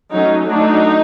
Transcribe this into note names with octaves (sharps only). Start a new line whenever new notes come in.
F#3 A3 C#4 D#4
F#3 A3 D4 D#4